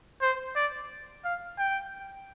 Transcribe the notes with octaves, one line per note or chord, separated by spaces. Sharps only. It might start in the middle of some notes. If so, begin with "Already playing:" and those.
C5
D5
F5
G5